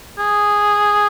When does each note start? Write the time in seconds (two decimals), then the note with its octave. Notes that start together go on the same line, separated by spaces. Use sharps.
0.19 G#4